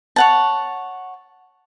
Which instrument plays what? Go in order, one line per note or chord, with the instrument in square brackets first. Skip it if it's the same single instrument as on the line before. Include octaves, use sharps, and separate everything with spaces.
[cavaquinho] C#5 F#5 A5